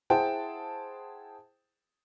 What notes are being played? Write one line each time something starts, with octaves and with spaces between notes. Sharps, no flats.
E4 G#4 C5 F#5 G5 A5